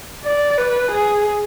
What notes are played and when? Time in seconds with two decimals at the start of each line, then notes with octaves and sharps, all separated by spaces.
0.24 D5
0.58 B4
0.91 G#4